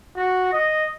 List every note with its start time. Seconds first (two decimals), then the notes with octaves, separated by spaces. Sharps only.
0.16 F#4
0.53 D#5